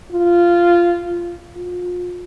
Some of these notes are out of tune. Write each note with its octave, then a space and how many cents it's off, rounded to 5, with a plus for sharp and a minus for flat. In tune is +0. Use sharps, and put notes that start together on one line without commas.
F4 -10
F4 +35